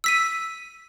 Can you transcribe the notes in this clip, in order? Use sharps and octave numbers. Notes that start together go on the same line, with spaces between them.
E6 B6 D#7